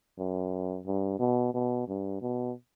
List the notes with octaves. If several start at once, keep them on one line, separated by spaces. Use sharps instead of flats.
F#2
G2
B2
B2
G2
B2